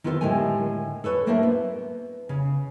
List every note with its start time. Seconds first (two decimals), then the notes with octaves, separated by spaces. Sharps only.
0.04 D#3 B3 F4 A4 A#4 C5
0.21 A2 D3 G#3 G4 A#4 G#5
1.04 A4 B4 C#5 D5
1.26 A2 A#3 D4 A#4 C5 E5
1.43 B3
2.29 C#3